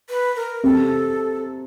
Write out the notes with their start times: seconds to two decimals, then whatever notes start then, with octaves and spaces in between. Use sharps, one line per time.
0.09 B4
0.36 A#4
0.64 C3 A4